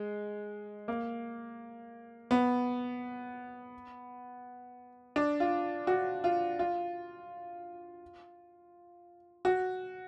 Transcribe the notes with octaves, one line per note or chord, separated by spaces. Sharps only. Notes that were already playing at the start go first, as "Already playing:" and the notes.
Already playing: G#3
A#3
B3
D4
F4
F#4
F4
F4
F#4